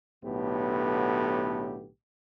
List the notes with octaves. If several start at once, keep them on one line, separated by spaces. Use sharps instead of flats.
B1 A2 D3 B3 G4